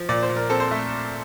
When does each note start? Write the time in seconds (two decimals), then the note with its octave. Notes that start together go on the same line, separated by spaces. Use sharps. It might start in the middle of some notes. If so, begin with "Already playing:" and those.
Already playing: F3
0.09 A#2 D5
0.23 C5
0.30 A#2
0.36 A#4
0.50 C4 A4
0.60 C5
0.71 A3 E5